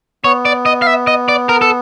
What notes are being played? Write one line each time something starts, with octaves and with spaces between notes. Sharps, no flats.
B3 C#5
D5
D#5
F5
E5
D#5
D5
A#4
A4